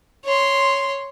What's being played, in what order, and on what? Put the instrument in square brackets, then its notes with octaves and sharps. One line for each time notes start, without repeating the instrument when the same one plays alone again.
[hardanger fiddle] C#5 C6